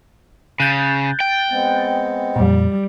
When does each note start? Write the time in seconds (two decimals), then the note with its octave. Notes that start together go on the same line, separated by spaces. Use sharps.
0.60 C#3 F#6 G6 A6
1.20 G5
1.50 G#3 B3 C4
2.36 F2 A#2 G3